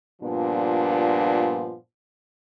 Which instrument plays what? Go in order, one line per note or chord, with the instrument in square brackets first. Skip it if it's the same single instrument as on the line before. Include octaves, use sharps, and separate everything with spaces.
[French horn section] G2 A#2 F3 B3 D4